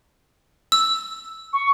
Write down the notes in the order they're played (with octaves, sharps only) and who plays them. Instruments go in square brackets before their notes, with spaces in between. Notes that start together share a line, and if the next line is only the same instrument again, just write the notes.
[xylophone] E6
[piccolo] C#6